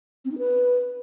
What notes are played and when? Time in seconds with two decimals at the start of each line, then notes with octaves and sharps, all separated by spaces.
0.25 C4
0.31 D#4
0.38 B4